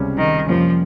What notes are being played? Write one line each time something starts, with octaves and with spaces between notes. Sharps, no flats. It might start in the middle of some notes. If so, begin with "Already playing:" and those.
Already playing: C#2 C3 G3 C#4
D#3
F2 C3 F3 G3 A#3 C#4